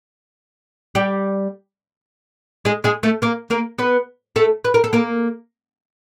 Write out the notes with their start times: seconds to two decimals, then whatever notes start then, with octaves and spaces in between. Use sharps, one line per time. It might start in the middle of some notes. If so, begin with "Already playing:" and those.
0.95 G3 G4
2.65 G#3 G#4
2.84 G#3 G#4
3.03 A3 A4
3.22 A#3 A#4
3.50 A#3 A#4
3.78 B3 B4
4.36 A3 A4
4.64 B4
4.74 A#4
4.84 A4
4.93 A#3 A#4